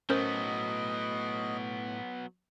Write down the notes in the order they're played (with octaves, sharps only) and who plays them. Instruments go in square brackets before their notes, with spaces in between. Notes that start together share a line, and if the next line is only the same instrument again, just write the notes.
[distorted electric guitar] A2 [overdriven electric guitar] F#3 B3 [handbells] C#4 A#4 C5 [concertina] D#5